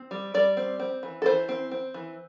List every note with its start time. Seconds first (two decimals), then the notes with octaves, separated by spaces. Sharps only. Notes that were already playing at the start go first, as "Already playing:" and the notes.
Already playing: C4
0.11 G3
0.34 G3 D5
0.57 C4
0.79 C4
1.03 E3
1.22 A4
1.26 E3 C5
1.49 C4
1.71 C4
1.94 E3